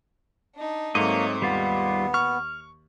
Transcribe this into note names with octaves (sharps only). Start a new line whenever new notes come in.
D4 D#4
G#2 F#3 A3 A#3 C4 C#5 D#5
D#2 G3 B3 F4
C#6 F6